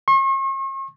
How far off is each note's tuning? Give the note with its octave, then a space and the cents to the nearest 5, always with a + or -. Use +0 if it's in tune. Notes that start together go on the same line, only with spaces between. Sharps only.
C#6 -45